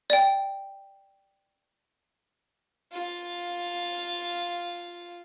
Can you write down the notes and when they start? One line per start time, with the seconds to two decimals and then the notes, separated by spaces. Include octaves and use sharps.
0.10 D5 G5
2.92 F4 F5